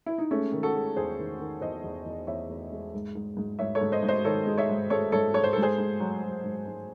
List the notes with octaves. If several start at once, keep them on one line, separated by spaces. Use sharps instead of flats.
E4
D#4
G#3 A3 C#4
D#3
F#4 A4
G#3
E2 G#4 C5
D#3
D#3
E2 C5 D#5
E2
E2
E2 C#5 E5
E2
G#3
G#2
G#2
G#2
G#2 C#5 E5
A4 C#5
G#2
C5 D#5
G#2
C5 D#5
D#3 A4 C#5
G#3
C#5 E5
G#2
G#3 A4 C#5
G#2 A4 C#5
G#2 C#5
C5
G#2 A4
G#4 C5
G#2
F#3
F#3
G#2
G#2